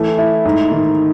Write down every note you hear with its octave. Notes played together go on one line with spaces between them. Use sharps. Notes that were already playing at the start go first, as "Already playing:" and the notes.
Already playing: E3 A3
E4
G#2
D#3